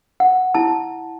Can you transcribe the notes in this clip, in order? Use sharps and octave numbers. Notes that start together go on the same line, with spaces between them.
F#5
E4 A5